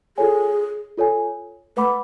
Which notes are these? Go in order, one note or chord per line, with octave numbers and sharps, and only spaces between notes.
F4 G#4 A4 C#5 G#5
F4 A4 C#5 G#5
A3 B4 F#5 B5 D6